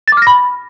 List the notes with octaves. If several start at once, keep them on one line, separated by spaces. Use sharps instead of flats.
B5 D6 F6 A6 A#6